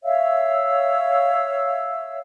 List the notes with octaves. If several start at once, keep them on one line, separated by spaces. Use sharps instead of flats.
C#5 E5 F5 E6